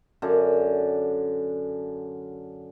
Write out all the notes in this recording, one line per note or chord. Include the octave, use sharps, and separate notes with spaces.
F#2 D3